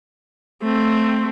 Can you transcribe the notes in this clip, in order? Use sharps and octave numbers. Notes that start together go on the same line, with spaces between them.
A3 C4